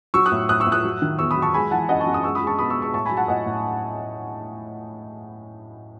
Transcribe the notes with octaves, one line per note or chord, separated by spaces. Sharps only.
F#3 C#6 E6
D#6 F#6
A2
A2 D#6 F#6
C#6 E6
A2
D#6 F#6
F#3
D#3
E2 C#6 E6
B5 D#6
F#3
A5 C#6
G#3 G#5 B5
E3 F#5 A5
F#2 D#5 F#5
A5 C#6
F#2
D#6
G#3 C#6 E6
B5 D#6
G#3
A5 C#6
B2 B5 D#6
C#6 E6
G#3
C#6 E6
A2 A5 C#6
G#5 B5
F#3
F#5 A5
A2 D#5 F#5
A2